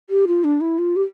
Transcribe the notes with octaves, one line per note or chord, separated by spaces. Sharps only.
G4
F4
D4
E4
F4
G4